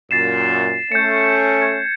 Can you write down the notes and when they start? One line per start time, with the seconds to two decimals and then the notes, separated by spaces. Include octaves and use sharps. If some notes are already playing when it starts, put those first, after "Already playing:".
0.11 F#2 A#2 A6 C7 E7
0.92 A3 C#4 G6 C#7
1.62 G#6